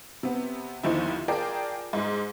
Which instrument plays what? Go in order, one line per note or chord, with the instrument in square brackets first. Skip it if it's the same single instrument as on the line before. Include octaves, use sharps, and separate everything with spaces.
[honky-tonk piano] C3 B3
G1 D#2 F3 D#4 E4
F4 G#4 A#4 D5 G5 A5
G#2 G#3